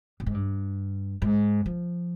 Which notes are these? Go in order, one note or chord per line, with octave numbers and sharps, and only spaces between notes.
A#2
G#2
G2
G#2
F3